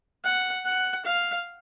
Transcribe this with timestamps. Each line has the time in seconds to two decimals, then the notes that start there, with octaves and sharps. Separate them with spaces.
0.24 F#5
0.65 F#5
1.05 F5